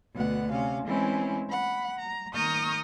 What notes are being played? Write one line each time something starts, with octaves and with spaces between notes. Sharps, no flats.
D2 B2 B3 F#5
C3 C#4 F5
E3 G#3 C4 C#4 E4
F#5 B5
A#5
D#3 A#5 C#6 D#6 F6 G6